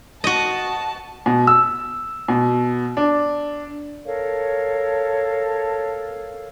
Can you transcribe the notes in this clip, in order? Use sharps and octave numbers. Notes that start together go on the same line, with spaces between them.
F#4 D#5 A5
B2
E6
B2
D4
A4 A#4 C#5 F5